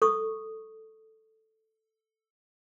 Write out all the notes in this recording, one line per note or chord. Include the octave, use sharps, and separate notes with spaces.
A4 C#6 D#6